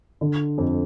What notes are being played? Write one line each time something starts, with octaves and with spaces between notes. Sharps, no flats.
D3
F2